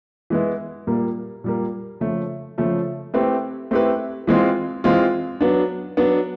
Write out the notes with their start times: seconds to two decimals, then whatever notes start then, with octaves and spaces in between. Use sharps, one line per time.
0.30 E3 G#3 B3 E4
0.87 A#2 G3 A#3
1.44 A#2 G3 A#3
2.00 C#3 F3 A3
2.58 C#3 F3 A3
3.14 A3 C4 E4 G4 B4
3.71 A3 C4 E4 G4 B4
4.27 E3 G#3 C4 F4
4.84 E3 G#3 C4 F4
5.41 F#3 B3 D4
5.97 F#3 B3 D4